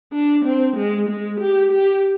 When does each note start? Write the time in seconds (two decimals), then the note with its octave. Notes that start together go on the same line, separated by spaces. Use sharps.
0.13 D4
0.45 C4
0.76 G#3
1.09 G#3
1.40 G4
1.72 G4